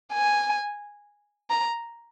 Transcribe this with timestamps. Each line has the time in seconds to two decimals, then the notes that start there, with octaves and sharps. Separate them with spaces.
0.13 G#5
1.50 A#5